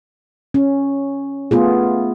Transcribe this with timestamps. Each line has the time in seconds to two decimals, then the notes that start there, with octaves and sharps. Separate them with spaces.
0.54 C#4
1.51 A3 B3 F4 G#4